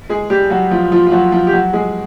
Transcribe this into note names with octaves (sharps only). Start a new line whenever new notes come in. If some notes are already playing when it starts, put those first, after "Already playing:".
G#3 G#4
G3 G4
F#3 F#4
F3 F4
F3 F4
F4
F#3 F#4
F3 F4
G4
F#3 F#4
G#3 G#4